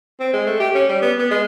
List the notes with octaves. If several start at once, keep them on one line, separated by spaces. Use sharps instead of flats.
C4
G#3
A3
G4
C#4
G3
B3
B3
G#3